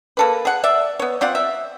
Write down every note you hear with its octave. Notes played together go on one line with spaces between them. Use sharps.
A#3 A4 B4
G#4 F#5
D5 E5
B3 C#5
C4 F4 D5 F#5
E5